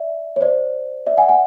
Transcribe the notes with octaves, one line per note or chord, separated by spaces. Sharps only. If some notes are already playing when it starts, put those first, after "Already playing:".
Already playing: D5 E5
C#5
C5 D5
D5 E5
F#5 G#5
F#5 G#5